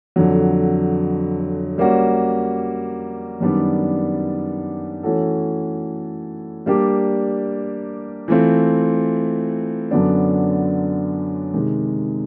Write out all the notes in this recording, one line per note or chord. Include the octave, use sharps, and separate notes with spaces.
F2 D3 F#3
G3 A#3 C#4 F#4
F#2 D#3 G3 B3 D4
E3 A3 C#4 F#4 A4
G3 A#3 D4 G4
E3 A3 C4 F4
F#2 D3 F#3 B3 D4
C3 D#3 G#3